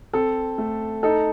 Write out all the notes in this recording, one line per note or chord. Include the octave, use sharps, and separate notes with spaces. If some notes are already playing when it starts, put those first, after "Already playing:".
C4 A4
A3
D#4 A4